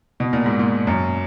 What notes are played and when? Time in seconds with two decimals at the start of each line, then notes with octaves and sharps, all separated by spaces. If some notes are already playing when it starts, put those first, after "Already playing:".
0.20 B2
0.33 A#2
0.46 G#2
0.59 A#2
0.87 F#2